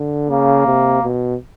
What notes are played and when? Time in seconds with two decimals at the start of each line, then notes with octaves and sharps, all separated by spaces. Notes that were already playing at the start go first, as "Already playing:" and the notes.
Already playing: D3
0.30 C#3 A#3
0.66 C3
1.03 B2